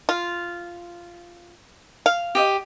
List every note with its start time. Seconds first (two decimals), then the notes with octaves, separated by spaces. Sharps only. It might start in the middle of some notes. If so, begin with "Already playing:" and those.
0.09 F4
2.06 F5
2.35 G4 D#5